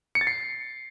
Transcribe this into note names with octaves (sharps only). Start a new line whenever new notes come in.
C#7
A6
C7